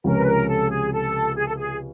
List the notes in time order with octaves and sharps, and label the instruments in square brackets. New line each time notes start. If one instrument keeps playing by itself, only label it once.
[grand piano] C#2 C3 F3 G#3 C#4 [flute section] A#4
[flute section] B4
A#4
A4
G#4
A4
G#4
A4
G#4